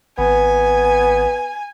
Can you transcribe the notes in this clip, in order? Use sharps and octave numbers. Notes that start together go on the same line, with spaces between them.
G#1 B3 G#5